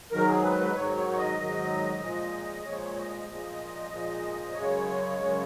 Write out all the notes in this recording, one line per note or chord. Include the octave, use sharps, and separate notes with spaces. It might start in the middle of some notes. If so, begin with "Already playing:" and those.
G#2 D#3 F#3 A#4
G#4
B4
B4
G#2 D#3 F#3 C#5
C#5
C#5
D#5
G#2 D#3 F#3
A#2 F3 G#3
A#2 F3 G#3 C#5
D#5
A#2 F3 G#3 D#5
A#2 F3 G#3
F#2 C#3 G#3 C#5
F#2 C#3 G#3